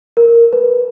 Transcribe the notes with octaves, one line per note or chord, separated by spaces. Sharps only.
A#4
B4